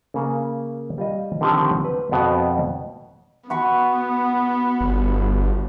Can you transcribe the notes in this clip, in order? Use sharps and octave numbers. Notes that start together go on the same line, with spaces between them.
C#3 A#3
G3 F4 D#5
D3 D#3 F3 C4 G4
B4
F2 B2 B3
B3 F#4 B5 C#6
G1